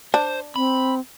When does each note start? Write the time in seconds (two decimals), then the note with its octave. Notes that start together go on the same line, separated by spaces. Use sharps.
0.14 D4 C5
0.56 C4 B5